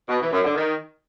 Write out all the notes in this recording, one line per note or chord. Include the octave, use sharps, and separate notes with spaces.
B2
E3
F#2
D3
D#3